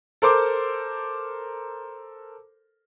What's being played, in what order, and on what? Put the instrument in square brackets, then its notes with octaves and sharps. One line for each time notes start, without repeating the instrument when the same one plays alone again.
[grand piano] A4 A#4 C5 C6 D6